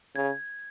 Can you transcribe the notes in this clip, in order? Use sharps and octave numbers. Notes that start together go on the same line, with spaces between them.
C#3 G#6